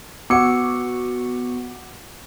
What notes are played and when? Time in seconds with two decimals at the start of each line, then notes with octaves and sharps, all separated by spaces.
0.30 B3 F#4 F#5 D6 C#7